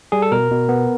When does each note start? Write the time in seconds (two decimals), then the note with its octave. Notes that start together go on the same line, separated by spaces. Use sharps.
0.12 G3 G#4
0.22 A4
0.32 B2 A#4
0.51 B2
0.69 B3